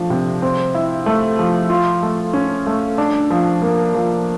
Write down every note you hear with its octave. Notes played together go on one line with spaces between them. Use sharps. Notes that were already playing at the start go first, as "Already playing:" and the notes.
Already playing: F3 A3 D4
C3
C4
E4
A3
F3
F4
A3
C#4
A3
D4
F3
A#3
F3